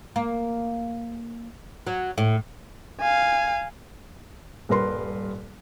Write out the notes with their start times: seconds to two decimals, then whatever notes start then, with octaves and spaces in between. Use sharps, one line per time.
0.16 A#3
1.87 F#3
2.18 A2
3.01 F5 G#5
4.69 D#1 G2 A#4 B4 C6